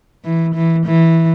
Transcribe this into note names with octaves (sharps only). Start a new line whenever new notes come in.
E3
E3
E3